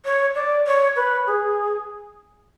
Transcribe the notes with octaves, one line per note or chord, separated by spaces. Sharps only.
C#5
D5
C#5
B4
G#4